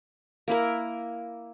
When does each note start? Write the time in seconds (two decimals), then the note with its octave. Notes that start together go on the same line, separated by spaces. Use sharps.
0.48 A#3 E4 A#4